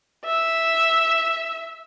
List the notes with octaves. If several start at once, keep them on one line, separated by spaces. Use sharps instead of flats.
E5